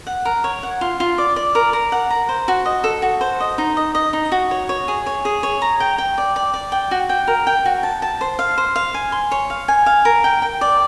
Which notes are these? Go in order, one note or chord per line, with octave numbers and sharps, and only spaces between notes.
F#5
A#4
C#5
F#5
F4
F4
D5
D5
A#4
A#4
F#5
A#5
C5
F#4
D#5
A4
F#4
C5
D#5
D#4
D#5
D#5
D#4
F#4
C#5
C#5
G#4
C#5
G#4
C#5
A#5
G5
G5
D5
D5
D5
G5
F#4
G5
A#4
G5
F#4
A5
A5
C5
F5
C5
F5
G#5
C6
C#5
F5
G#5
F5
A#4
G5
G5
D5